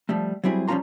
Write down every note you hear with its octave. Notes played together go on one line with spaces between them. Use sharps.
F3 G3 A3
F#3 G3 C4 E4 G#4
F3 G3 C#4 F4 A#5 C6